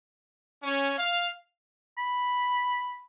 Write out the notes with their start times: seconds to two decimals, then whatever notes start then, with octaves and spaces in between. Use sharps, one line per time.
0.63 C#4
0.97 F5
1.98 B5